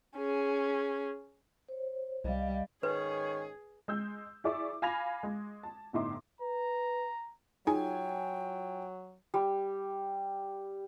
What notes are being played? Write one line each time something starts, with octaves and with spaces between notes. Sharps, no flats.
C#4 G#4
C5 C#5
C2 G3 D#5 F5
G#2 D#3 C#4 G#4 B4 C#5
G#3 E6 G6
E4 G#4 D5 E5 C#6 D6
F5 G#5 B5 G#6 A#6 F7
G#3
A5
G1 A2 D#4 E5 C6 D6
B4 A#5
F#3 D#4 F4 G#4 G5 G#5
G3